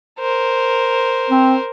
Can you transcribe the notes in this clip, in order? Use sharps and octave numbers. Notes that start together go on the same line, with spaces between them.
A#4 C5
C4